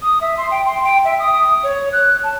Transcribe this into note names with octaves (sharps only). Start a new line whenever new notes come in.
D#6
E5
C6
G5
C6
G5
E5
D#6
C#5
F#6
A5